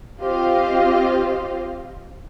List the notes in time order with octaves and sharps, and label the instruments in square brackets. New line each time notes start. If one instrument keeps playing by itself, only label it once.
[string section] C4 F4 G4 C5 D#5 F5